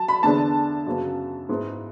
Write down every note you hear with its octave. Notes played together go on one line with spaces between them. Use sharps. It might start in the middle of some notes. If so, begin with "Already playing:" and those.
Already playing: F#3 A5
B5
E2 D3 G#3 B3 D4 A5
F#2 C#3 F#3 B3
G#2 G#3 B3 E4